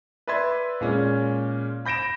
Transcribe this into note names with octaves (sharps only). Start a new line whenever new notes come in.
B4 D5 E5 C6 G#6
A#2 G#3 C#4
B5 G6 A#6 D7 E7